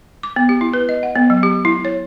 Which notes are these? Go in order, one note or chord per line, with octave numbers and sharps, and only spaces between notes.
D6
B3
G4
E4
B4
D#5
F#5
B3
F#3
G4
E4
C#5